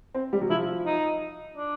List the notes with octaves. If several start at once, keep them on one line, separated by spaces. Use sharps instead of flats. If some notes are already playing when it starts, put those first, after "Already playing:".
C4
G3
F#3
F3 E4
D#4
D4